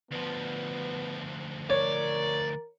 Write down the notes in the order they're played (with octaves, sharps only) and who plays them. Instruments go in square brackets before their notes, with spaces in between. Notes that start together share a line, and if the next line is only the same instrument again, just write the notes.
[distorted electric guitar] D2 F3 [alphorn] B3
[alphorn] A#4 [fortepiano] C#5 [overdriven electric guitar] D5